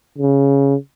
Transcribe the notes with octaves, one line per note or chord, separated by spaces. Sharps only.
C#3